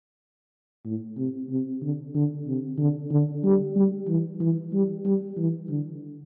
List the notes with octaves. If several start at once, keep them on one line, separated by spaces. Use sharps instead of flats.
A2
C3
C3
D3
D3
C3
D3
D3
G3
G3
E3
E3
G3
G3
E3
D3